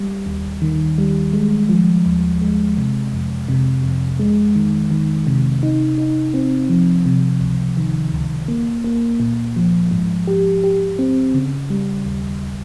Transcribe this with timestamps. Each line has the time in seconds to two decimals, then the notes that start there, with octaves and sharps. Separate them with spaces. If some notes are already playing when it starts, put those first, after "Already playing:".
Already playing: G3
0.26 D#2
0.62 D#3
0.98 G3
1.33 G#3
1.69 F3
2.06 D#2
2.42 G#3
2.77 C3
3.13 F2
3.48 C3
3.84 F2
4.20 G#3
4.56 D#3
4.91 D#3
5.27 C3
5.63 D#4
5.98 D#4
6.34 C4
6.69 F3
7.06 C3
7.41 C#2
7.77 D#3
8.13 C#2
8.48 A#3
8.84 A#3
9.20 A#2
9.56 F3
9.91 G#2
10.27 G4
10.64 G4
10.99 C4
11.34 C#3
11.70 G3
12.05 D#2